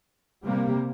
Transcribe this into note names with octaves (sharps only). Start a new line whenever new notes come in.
C3 G3 A#3